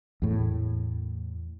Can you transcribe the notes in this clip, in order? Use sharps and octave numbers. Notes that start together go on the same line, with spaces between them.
E2 A2